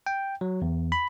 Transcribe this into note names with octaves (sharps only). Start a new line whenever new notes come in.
G5
F#3
E2
B5